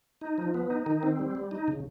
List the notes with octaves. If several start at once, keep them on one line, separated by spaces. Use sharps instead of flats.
D#4
F3
B3
D#4
D#3
C4
G3
G3
D#4
C#3